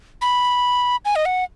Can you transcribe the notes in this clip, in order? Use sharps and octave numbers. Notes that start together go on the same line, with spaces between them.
B5
G#5
D#5
F#5